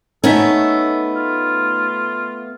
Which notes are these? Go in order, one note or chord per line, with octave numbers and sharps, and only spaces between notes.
A3 B3 C#4 D#4 A4 E5
F4